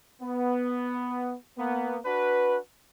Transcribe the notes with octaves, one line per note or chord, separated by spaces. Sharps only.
B3
A#3 B3
D4 F#4 B4